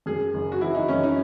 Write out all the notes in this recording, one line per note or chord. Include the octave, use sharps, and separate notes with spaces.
F#2 G#4
F#1
F#4
E3 E4
D#4
F#2 C#4
D#4